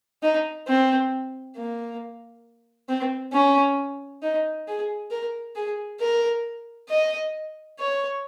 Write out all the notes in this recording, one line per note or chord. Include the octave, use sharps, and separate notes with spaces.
D#4
C4
A#3
C4
C#4
D#4
G#4
A#4
G#4
A#4
D#5
C#5